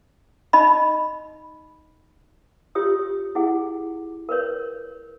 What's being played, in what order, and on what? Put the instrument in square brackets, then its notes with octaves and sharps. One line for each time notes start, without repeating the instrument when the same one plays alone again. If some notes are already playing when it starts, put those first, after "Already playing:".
[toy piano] D#4 D#5 B5
F4 G4 C#5 D#6
E4 G#4 F#5
A#4 B4 C#5